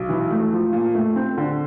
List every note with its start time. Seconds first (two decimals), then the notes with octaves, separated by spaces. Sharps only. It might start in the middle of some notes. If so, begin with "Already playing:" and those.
Already playing: B1
0.09 E3
0.31 A3
0.52 F3
0.73 A#2
0.95 A3
1.16 C4
1.37 D3